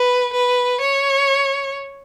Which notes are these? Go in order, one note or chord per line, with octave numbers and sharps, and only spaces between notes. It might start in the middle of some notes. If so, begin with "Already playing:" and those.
Already playing: B4
B4
C#5